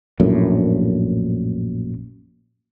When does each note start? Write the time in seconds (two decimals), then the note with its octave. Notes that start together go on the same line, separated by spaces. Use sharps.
0.20 A#1 F#2 A2